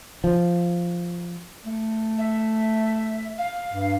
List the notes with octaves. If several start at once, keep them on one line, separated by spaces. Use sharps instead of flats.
F3
A3
E5
F5
G2